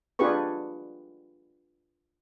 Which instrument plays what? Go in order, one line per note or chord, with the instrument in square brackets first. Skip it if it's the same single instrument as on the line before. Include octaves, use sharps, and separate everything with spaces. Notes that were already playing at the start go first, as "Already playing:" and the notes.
[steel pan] D4 F4 G4 G#4 B4 C#6